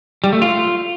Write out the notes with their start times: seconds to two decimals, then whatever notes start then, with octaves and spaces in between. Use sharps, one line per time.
0.24 G3
0.33 A3
0.42 F4